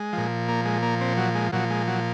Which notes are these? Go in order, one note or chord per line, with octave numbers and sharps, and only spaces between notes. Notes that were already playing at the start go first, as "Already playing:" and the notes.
Already playing: G#3
A#2 F3
A#3
G#3
A#3
C4
F#3
G#3
A#2 F3 F#3
G#3
F#3